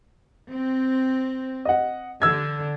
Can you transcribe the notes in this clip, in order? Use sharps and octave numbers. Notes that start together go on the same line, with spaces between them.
C4
D#5 F#5
D3 E6 G#6